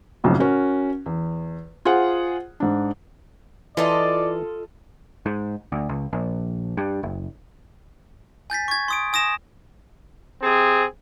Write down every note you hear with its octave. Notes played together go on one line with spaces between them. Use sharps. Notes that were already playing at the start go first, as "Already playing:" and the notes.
F#1 B1 F2 A2 C#3
C#4 F#4 A#4
E2
F4 G#4 C5 F#5
G#2 D4
E3 F4 A4 D5 D#5
G#2
D2
C#2
A#1
G2
F#1
G#5 G6 A6 B6
C#6 G#6
C6 D#6 D7
G#5 D#6 A#6 E7
C3 C4 G#4